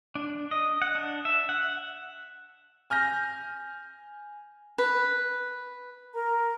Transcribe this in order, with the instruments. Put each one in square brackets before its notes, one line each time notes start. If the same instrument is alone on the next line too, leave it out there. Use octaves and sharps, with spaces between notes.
[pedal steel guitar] D4
D#5
F#5
D4
E5
F#5
[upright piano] G#5 F6 G6 A#6
[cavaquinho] B4
[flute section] A#4 A#5